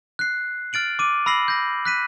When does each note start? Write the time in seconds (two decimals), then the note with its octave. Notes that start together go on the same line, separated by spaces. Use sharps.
0.19 F#6 C7
0.73 F6 A6 D7 F#7
0.99 D6 D#7
1.26 B5 E6 A#6 C7 F#7
1.48 G6 A#6
1.85 F#6 B6 D#7